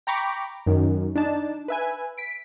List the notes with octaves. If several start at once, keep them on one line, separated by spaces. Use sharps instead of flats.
G5 A#5 B5 C#6 D6
F#2 D#3
D4 D#4 A5
B4 E5 G#5
B6 D7